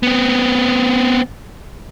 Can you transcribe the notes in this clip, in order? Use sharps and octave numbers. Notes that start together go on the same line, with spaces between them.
B3 C4